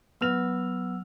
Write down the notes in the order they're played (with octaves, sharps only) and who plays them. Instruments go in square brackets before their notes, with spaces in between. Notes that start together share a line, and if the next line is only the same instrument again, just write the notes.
[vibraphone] F#3 E6 [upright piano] B3 F6 F7